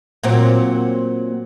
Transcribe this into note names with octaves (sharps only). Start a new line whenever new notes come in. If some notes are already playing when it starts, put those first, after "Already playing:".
A#2 F#3 C4